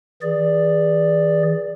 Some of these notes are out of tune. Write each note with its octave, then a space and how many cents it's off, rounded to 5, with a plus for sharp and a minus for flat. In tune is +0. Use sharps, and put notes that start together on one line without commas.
E3 -30 G#4 -15 D5 +0